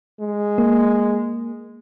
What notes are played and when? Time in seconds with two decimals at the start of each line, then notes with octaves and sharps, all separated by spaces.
0.20 G#3
0.58 A#3